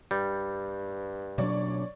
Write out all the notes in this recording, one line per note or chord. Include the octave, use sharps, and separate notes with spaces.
G2 G3
B2 F#3 D4 C#5 D5 C#6